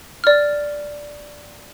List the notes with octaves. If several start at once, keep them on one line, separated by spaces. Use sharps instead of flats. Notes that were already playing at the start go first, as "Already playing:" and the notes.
D5 F6